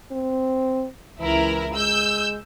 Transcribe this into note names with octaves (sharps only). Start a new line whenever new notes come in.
C4
C#2 E3 E4 A#4
G#3 E6 G6